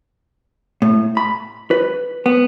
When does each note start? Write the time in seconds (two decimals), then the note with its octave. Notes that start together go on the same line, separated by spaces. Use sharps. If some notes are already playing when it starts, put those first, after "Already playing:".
0.82 A2
1.17 B5
1.71 B4
2.26 B3